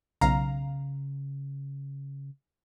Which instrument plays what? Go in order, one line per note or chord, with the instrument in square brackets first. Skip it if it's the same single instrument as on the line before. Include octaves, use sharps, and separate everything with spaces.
[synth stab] B1 F5 A#5 [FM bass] C#3